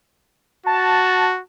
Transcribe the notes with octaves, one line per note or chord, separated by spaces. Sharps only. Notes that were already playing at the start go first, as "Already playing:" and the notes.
F#4 A5